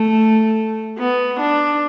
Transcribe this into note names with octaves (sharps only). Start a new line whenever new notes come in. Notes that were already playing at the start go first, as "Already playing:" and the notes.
Already playing: A3
B3
D4